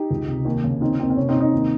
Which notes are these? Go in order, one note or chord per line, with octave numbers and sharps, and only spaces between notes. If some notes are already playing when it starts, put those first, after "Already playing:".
Already playing: D#4 G4
C#2
C3
D#2
C#3
D#3 C4 D#4
D#2 C4
C4
C3 C#4
C4 D#4
C3
C4 D#4
D#2